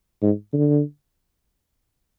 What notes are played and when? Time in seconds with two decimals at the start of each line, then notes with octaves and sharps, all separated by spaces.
0.22 G#2
0.53 D3